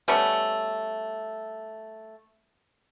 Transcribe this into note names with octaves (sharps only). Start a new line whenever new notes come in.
G3 A3 B3 C#4